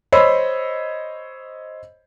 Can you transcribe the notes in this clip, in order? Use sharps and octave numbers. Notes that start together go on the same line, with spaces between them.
C5 C#5 D#5 B5 E6